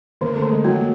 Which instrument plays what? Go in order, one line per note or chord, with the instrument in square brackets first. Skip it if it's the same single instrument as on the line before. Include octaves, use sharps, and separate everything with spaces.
[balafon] D3 [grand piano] A#3
[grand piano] A3
[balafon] D3
[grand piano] G#3
[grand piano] F#3 [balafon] A#3